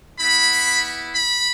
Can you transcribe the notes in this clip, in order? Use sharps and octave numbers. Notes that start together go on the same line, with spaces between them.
B3 E4 B5
B5